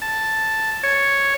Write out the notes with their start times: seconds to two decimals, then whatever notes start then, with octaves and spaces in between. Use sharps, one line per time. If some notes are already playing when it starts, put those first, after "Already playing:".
0.02 A5
0.83 C#5